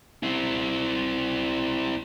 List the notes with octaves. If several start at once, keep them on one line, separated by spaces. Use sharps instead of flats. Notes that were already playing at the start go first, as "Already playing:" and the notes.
C4 E4